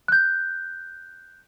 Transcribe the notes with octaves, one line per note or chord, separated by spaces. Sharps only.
F#6 G6